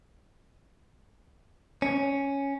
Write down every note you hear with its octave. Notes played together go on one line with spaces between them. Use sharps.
C#4